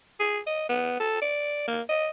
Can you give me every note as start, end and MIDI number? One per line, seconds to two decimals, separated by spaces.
0.20 0.39 68
0.46 0.64 75
0.69 0.96 59
1.00 1.19 69
1.21 1.64 74
1.68 1.82 58
1.89 2.10 75